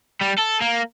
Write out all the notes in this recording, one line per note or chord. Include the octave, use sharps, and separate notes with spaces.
G3
A4
A#3